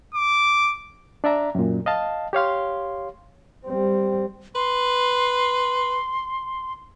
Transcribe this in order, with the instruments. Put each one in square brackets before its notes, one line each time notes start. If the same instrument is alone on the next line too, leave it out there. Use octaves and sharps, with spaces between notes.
[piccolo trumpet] D6
[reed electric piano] D4 D5 E5 A#5
F#2 A#2
D#5 F5 A5
G4 C#5 F5 C6
[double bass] G3 C4
[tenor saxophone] B4 [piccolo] C6